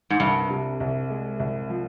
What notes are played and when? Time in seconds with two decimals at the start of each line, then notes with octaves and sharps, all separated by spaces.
0.10 G#2
0.20 C2 G2
0.50 C3
0.80 C2
1.10 G#3
1.40 C2
1.70 F3